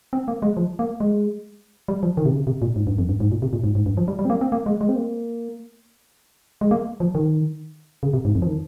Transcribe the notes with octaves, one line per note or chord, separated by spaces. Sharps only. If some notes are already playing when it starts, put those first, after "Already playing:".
C4
A#3
G#3
F3
A#3
G#3
G3
F3
D#3
C3
C#3
C3
A#2
G#2
G2
F2
G2
G#2
A#2
C3
A#2
G#2
G#2
G2
F3
G3
G3
C4
A#3
C4
A#3
G#3
G#3
C4
A#3
G#3
A#3
F3
D#3
C#3
C3
G#2
F2
F3
D#3